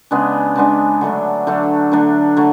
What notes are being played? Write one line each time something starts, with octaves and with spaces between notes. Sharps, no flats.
C#3 G#3 B3 D4
C#3 G#3 B3 D4
D3 F#3 A3 D4
D3 F#3 A3 D4
D3 F#3 A3 D4
D3 F#3 A3